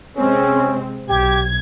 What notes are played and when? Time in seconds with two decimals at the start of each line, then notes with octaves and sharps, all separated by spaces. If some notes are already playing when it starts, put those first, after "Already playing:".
0.17 C3 G#3 C4 C#4
1.09 B1 G4 G#6